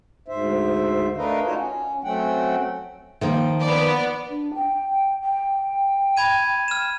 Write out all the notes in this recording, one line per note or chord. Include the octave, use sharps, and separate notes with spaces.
D2 G#2 C5 E5
A3 D4 A#4 B4 D#5 F5
D#4 F4 F#4 C#5
C#4
F#3 A3 C4 C#4 F#5 G5
D#3 F3 A#3
B3 D5
D4
G5
G5
B5 G#6 D#7
F6 E7